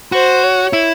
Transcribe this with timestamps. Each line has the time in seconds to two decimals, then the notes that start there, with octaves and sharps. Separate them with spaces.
0.12 F#4 C5
0.43 C#5
0.73 E4